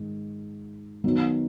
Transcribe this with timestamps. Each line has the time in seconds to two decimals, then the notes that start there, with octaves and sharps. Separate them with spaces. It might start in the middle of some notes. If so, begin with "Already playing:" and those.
Already playing: G#2 D#3
1.04 D#3 F#3 B3